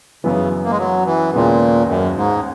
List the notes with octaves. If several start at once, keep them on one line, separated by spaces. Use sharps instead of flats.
F#2 C#3 E3 B3
A#3
G#3
F#3
E3
D#2 A#2 C#3 G#3 B3
F#2
G#2